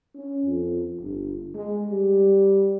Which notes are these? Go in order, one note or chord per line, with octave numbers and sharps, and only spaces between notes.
C#4
F2
G1
G#3
G3